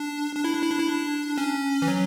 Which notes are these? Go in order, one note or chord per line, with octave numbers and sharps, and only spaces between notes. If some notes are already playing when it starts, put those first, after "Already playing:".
Already playing: D4
D4
E4
D4
E4
D4
E4
D4
C#4
E3
F#3